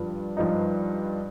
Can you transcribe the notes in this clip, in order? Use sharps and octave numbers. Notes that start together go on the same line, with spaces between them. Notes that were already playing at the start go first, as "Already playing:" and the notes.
Already playing: G2 F3
G2 F3 D#4